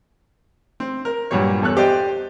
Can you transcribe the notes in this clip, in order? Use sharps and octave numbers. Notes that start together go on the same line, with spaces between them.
C4
A#4
G2 A#2 F#3 G3 C#5
E2 A4 C#5 F#6
G4 C5 D5 D#5 G5